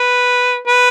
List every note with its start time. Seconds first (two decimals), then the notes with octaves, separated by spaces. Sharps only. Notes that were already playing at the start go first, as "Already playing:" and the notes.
Already playing: B4
0.67 B4